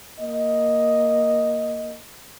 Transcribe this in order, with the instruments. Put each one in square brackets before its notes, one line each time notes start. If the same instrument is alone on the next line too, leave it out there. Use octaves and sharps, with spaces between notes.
[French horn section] A#3 D#5